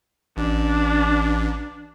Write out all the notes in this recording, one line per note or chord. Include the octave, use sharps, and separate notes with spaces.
A1 D4